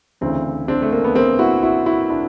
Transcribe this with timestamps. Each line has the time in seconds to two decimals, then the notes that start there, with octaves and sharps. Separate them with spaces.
0.21 D2 C#3 E3 C4 D4
0.68 C4 D4
0.82 A3
0.93 A#3
1.04 B3
1.15 A#3 C4
1.39 E4 F#4
1.63 E4 F#4
1.86 E4 F#4
2.10 D4 E4